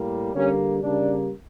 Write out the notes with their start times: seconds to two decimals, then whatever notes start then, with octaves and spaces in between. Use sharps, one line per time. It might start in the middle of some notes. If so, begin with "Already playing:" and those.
Already playing: A2 G3 A#3
0.35 D3 G3 A#3 C#4
0.82 C#3 G3 A#3 D4